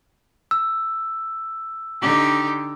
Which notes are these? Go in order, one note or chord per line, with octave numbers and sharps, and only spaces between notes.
E6
D3 D#4 G4